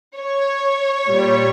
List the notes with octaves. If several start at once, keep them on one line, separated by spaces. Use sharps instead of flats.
C#5
A#2 G3